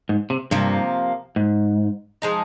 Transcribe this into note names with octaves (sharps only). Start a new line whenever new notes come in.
G#2
C3
G2 C3 F3 A#3
G#2
F3 G#3 D#4